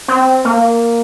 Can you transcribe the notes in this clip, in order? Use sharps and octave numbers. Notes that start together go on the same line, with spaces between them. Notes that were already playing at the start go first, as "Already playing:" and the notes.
C4
A#3